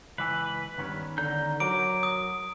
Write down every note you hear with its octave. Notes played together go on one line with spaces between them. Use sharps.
C#2 E3 B4 G#5
G2 D#3 B3 C#4
D3 A#5 G6
F#3 A#4 D6 D7
D#6